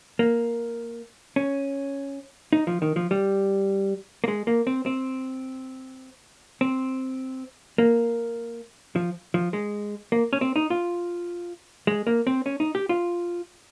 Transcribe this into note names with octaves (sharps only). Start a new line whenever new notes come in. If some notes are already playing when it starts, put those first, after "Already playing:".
A#3
C#4
D#4
F3
D#3
F3
G3
A#3
G#3
A#3
C4
C4
C4
A#3
F3
F3
G#3
A#3
C#4
C4
D#4
F4
G#3
A#3
C4
C#4
D#4
G4
F4